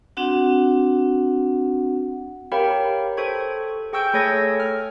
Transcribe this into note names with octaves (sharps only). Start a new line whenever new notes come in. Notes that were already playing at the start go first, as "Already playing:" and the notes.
C4 D4 F#4 F#5
G4 A#4 C#5 F5 G5 B5
A4 C5 C#6 G#6
G#4 G5 C#6 E6 G6 D7
A3 G#4 A4 C#5 G#6 A#6
F6